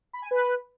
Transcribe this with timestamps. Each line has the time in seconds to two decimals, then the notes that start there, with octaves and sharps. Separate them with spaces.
0.13 B5
0.22 G#5
0.31 B4